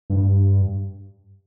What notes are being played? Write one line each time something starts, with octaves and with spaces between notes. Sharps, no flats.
G2